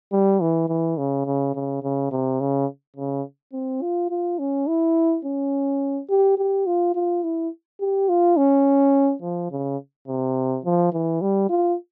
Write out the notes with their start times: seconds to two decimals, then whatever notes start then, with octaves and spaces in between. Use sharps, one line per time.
0.12 G3
0.41 E3
0.69 E3
0.98 C#3
1.26 C#3
1.55 C#3
1.83 C#3
2.12 C3
2.40 C#3
2.96 C#3
3.53 C4
3.82 F4
4.10 F4
4.39 C#4
4.67 E4
5.25 C#4
6.10 G4
6.37 G4
6.66 F4
6.95 F4
7.23 E4
7.80 G4
8.09 F4
8.37 C#4
9.22 F3
9.51 C#3
10.08 C3
10.65 F3
10.93 E3
11.22 G3
11.50 F4